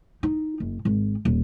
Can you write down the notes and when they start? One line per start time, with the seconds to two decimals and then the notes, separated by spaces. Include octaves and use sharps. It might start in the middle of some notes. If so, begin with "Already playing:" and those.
0.23 D#4
0.60 F#1
0.85 G#1
1.25 D#1